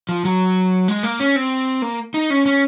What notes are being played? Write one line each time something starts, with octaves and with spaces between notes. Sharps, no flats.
F3
F#3
G#3
A#3
C#4
C4
A#3
D#4
C#4
C#4